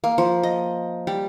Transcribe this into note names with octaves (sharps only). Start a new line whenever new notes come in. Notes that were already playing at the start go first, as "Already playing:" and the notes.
A#3
F3
D#5
G3